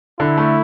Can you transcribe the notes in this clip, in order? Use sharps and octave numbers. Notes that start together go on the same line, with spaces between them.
D3 E4
A3